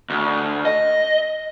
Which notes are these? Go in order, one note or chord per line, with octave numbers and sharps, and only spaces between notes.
D2
D#5